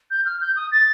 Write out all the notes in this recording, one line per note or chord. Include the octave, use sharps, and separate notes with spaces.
G6
F6
G6
D#6
A6